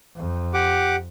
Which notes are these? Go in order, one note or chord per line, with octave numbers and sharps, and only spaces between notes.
F2
G4 F#5 D6